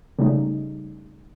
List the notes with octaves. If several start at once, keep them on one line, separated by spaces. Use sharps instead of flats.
C#3 G3 A3 D#4